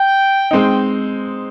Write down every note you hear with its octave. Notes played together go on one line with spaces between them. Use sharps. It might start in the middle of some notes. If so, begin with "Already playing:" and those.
Already playing: G5
G#3 C4 D#4